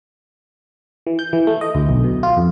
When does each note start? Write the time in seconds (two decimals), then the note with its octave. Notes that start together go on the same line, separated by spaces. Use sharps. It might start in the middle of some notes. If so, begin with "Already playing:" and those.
1.07 E3
1.19 G6
1.33 E3
1.47 A3
1.61 D#5
1.75 D2
1.89 B1
2.04 B2
2.23 F4
2.37 F2